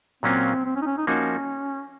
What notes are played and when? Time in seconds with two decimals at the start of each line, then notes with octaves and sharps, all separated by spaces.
0.23 A#2 F#3 A#3 C4 C#4 F4
0.65 C4
0.76 C#4
0.82 D#4
0.86 C#4
0.97 D#4
1.07 F3 A#3 C#4 D#4 F#4